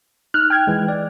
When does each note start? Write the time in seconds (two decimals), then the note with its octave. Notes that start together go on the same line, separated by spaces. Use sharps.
0.34 D#4 F6 F#6
0.50 G5 G#6
0.67 E3 G#3
0.88 D5